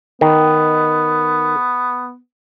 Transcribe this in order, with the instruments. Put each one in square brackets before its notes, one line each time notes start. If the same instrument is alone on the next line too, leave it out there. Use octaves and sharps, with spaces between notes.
[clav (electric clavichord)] D#3 [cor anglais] B3